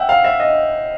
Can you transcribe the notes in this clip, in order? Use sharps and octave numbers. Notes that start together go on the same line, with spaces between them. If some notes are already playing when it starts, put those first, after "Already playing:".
Already playing: E5 F#5 G5
F5
E5
D#5